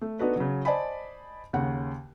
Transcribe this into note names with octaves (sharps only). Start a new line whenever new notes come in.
A3
B3 D4 D#4 F#4 A4 B4
C#3 F#3
C5 D5 D#5 G#5 A5 B5
D#2 C#3 F#5